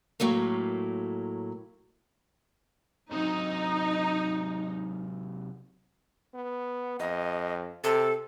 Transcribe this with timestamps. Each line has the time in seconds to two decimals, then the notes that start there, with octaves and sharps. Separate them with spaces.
0.20 A2 F#3 A3 A#3
3.12 C3 F#3 D#4
6.34 B3
7.00 F2 D#5
7.84 C3 A4